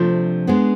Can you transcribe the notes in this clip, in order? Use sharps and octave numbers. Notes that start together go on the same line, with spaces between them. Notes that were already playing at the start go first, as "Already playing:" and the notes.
Already playing: C3 F3 A3 D4
G#3 B3 D4